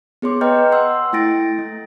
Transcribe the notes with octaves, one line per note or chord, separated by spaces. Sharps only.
B3 G#4 C#5 C6 D6
B4 D#5 G5 A#5 F6 G6
F#5 C6 E6
A3 E4 G5 A6 A#6 D7
A3